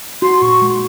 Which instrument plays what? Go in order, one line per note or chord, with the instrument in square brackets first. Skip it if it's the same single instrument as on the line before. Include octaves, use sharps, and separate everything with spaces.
[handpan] F#4 [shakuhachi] C6
[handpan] A#2 [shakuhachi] C#6
[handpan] G#3